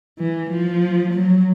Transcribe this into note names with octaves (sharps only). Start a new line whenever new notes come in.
E3
F3
F#3